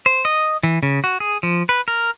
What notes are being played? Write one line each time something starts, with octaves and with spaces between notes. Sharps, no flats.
C5
D#5
E3
C#3
F#4
G#4
F3
B4
A#4